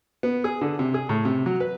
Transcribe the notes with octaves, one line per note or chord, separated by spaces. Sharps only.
B3
G#4
D3
C3
G#4
A2
C3
F#3
B4